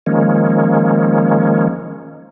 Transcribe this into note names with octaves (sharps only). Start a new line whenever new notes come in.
D#3 F3 G#3 A#3 C#4